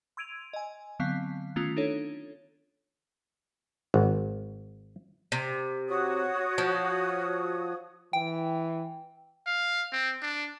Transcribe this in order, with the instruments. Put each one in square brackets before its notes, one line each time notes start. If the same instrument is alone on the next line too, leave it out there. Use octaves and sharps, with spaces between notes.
[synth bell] C6 E6 G#6 D7 D#7 F7
D#5 G#5
D3 F#3 B3 C4 F5
D#3 A3 B3 C#4 F4
D4 D#4 A4 C#5
[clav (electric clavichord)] G#1
[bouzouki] C3
[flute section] F#4 C#5 D#6
[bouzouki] F3
[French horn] E3 [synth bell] G5
[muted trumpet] F5
C4
D4